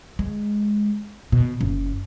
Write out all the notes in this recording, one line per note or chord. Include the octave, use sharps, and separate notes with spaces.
G#3
B2
F#1